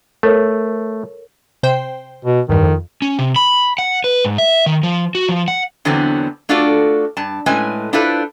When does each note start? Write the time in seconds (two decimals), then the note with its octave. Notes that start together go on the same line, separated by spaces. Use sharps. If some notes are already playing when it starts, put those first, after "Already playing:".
0.23 A3 A4 A#4 C#5
1.63 C3 C5 G5
2.25 B2
2.49 E2 G2 D#3
2.63 F2
3.02 C#4
3.19 C3
3.36 B5
3.78 F#5
4.04 B4
4.25 G#2
4.38 E5
4.66 D#3
4.83 F3
5.15 F#4
5.29 F3
5.48 F#5
5.85 E2 D3 E3 F#3 B3 C4
6.49 A3 D4 F4 F#4 A4 D5
7.17 G2 A5
7.46 A2 G#3 C#4 B4 G#5
7.93 D4 E4 F4 A4 B4 C5